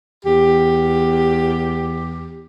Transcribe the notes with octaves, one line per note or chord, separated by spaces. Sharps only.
E2 G4